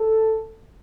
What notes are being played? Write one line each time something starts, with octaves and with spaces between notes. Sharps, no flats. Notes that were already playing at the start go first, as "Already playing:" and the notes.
Already playing: A4